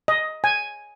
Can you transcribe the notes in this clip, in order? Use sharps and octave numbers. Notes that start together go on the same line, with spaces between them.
D#5
G#5